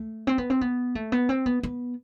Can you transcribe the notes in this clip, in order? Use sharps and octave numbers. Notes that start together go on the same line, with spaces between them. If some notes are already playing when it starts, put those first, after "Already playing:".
Already playing: A3
C4
B3
C4
B3
A3
B3
C4
B3
B3